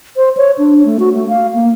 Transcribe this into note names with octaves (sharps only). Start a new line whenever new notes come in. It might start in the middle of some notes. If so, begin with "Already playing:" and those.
C5
C#5
D4
A3
F#4
A3
F5
A#3